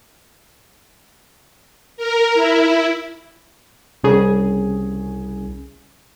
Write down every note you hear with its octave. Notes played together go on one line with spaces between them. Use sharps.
A#4
E4
C2 C#3 G#4